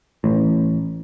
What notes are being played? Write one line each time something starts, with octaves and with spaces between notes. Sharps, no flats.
A1